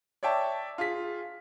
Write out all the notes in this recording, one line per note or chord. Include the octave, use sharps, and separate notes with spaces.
C#5 D5 E5 G5 A5
F4 G#4 B6